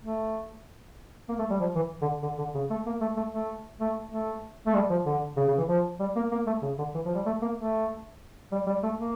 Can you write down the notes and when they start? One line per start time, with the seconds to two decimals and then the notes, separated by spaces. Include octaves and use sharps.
0.04 A3
1.29 A#3
1.39 A3
1.51 G3
1.60 F3
1.76 E3
2.02 D3
2.23 D3
2.38 D3
2.55 C#3
2.71 A3
2.87 A#3
3.01 A3
3.17 A3
3.34 A3
3.81 A3
4.12 A3
4.67 A3
4.74 G3
4.90 F3
5.06 D3
5.37 C#3
5.48 C#3
5.58 E3
5.68 F3
6.00 G3
6.16 A#3
6.32 A#3
6.47 A3
6.62 C#3
6.79 D3
6.95 E3
7.06 F3
7.15 G3
7.26 A3
7.42 A#3
7.57 A3
8.52 G3
8.67 G3
8.83 A3
8.98 A#3